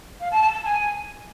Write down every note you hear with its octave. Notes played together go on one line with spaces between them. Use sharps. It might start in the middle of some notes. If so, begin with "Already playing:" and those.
F5
A5
A5
A5
G#5